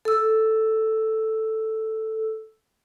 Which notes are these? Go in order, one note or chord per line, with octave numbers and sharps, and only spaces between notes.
A4 E6